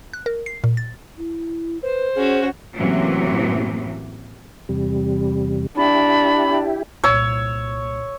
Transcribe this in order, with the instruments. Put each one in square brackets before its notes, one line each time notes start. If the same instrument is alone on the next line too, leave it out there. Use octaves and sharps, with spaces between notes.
[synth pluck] F#6
A#4
C7
A#2
A6
[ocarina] E4
[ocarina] B4 [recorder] C5
[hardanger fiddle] C#4 F#4 [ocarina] G#4
[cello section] F#2 A2 C3 E3 F#3 A#3
[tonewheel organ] E2 C3 G3
[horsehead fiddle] D4 [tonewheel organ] E4 G4 [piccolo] B5
[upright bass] C2 A#2 [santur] C#5 E6